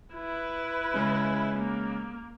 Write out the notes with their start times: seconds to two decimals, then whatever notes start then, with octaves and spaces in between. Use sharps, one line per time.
0.14 E4 B4
0.94 C#3 G#3 C#4
1.59 A#3